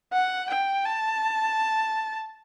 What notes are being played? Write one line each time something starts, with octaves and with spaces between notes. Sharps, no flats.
F#5
G5
A5